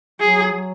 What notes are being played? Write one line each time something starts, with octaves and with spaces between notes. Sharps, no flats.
F#3 G#4
F#3